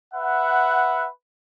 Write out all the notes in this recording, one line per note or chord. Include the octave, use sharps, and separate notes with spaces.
B4 E5 F#5